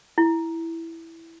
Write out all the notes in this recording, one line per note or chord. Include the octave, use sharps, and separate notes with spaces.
E4